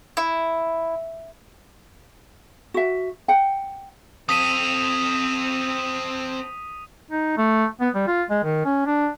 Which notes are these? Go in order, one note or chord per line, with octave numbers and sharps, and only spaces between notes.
E4
F#4 E5
F#5 G5
C4 A4 D#6 B6 D#7
D#4
A3
B3
G3
F4
G#3
D#3
C#4
D4